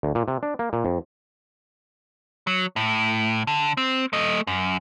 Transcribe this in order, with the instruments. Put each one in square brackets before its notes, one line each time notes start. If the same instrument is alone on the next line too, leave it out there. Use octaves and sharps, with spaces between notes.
[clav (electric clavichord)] D2
A#2
C3
D4
A#3
A#2
F2
[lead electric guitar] F#3
A2
D3
C4
A3 D#5
F#2